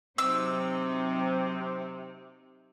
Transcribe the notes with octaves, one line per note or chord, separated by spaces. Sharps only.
C3 F#3 C4 D#4 E6